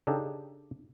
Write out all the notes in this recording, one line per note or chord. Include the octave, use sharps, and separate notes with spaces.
C#3 D4 D#4 G4 A4